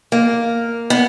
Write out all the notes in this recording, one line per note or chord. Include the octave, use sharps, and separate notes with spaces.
A#3
B3